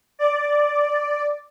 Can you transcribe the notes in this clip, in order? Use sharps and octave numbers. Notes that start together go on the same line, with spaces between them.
D5